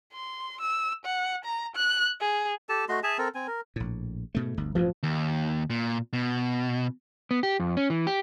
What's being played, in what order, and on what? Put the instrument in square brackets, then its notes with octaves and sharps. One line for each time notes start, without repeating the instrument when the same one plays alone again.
[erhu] C6
E6
F#5
A#5
F#6
G#4
[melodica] G4 A4 A5
A3 F#4 D#5 C6
G#4 E5 G#5 A5
C4 A4 A#4
C4 G#5
A#4
[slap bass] A#1 A2
G#2 B2 A3
G1 D2
[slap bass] A1 G2 [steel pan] F3
[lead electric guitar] D#2
A#2
B2
[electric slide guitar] B3
G4
F2
C#4
E3
G4